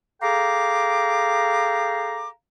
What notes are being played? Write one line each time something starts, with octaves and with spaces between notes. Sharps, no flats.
G#4 A4 F5 G5 A#5 D6